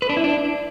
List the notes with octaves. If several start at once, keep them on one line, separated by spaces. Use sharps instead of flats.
B4
D4
E4
D4